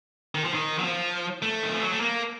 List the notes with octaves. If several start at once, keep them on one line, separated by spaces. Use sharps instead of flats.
D#3
F3
D#3
F#3
F3
A3
D#3
F3
F#3
A3
A#3